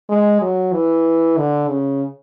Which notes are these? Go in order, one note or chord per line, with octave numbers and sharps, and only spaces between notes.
G#3
F#3
E3
D3
C#3